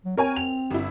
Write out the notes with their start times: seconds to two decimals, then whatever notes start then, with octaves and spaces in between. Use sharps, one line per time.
0.05 F#3
0.17 C4 A#4 C#5 G#5
0.36 F7
0.71 G1 E4